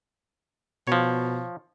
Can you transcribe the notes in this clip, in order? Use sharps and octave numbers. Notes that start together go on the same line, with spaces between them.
B2 F3 C#5